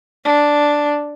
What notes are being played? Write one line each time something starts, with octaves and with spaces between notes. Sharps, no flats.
D4